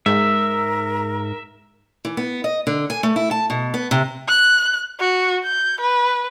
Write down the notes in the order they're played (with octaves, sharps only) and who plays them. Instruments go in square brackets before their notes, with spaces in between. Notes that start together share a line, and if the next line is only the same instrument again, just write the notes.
[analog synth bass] G#2 [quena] A#4 [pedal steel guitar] E5
[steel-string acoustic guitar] E3
B3
D#5
D3
G#5
A3
E4
A5
B2
B3
C3
[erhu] F#6
F#4
G6
B4